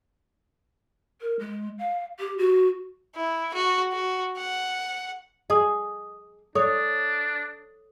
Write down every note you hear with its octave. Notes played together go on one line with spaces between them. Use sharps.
A#4
G#3
F5
G4
F#4
E4
F#4
F#4
F#5
G#4 D#5 D#6
D4 A4 C#5 D#6